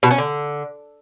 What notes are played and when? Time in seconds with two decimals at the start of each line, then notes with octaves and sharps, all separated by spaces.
0.03 B2
0.11 C#4
0.18 D3